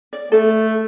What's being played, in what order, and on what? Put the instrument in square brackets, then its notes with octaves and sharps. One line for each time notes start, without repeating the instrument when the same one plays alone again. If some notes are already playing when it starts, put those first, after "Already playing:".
[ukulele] D5
[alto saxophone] A3 [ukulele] A4